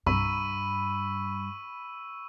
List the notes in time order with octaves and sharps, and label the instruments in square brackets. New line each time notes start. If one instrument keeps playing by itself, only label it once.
[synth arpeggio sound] C2 [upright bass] G2 [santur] B5 [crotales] C#6 E6 D#7